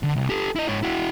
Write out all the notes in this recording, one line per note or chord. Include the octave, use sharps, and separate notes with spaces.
D3
C2
G4 A4
E4 D#5
G#2 C#5
E4 F#4